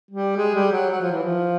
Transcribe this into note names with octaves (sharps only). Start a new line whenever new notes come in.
G3
G#3
G3
F#3
F#3
F3
E3
F3